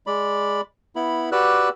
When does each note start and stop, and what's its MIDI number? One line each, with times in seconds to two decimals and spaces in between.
0.07 0.61 56
0.07 0.61 74
0.07 0.61 83
0.96 1.30 59
0.96 1.30 64
0.96 1.30 83
1.32 1.69 66
1.32 1.69 67
1.32 1.69 71
1.32 1.69 74
1.32 1.69 88
1.32 1.69 90